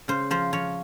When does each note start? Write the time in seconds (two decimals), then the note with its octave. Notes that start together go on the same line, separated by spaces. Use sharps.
0.08 C#3 C5
0.31 F3 C5
0.53 F3 C#5